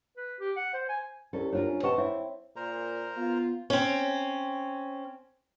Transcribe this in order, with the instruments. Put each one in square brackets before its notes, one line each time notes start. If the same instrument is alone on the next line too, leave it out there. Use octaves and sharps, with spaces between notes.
[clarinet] B4
G4
F#5
C5
G#5
[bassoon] C2 [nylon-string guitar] C#4 A4
[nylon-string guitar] D4 F4 A#4 [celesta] C#5
[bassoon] C#4
[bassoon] C4 [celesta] B4 C#6 [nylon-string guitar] D#5 F#5 A5
[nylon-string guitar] E4 [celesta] C#5 E5
[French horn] A#2 [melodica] A#4 C5 A#5
[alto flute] B3 [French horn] F4
[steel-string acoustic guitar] C4 C#4